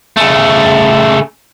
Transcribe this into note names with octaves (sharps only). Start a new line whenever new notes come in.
C#3 A3